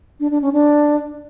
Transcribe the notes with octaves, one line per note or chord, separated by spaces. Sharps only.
D4
D4
C#4
D4